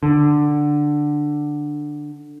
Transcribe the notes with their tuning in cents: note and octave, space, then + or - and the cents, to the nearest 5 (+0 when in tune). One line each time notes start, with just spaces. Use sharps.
D3 +10